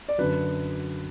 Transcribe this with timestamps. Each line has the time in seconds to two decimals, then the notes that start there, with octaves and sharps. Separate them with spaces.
0.09 D5
0.18 F#2 D3 F#3 B4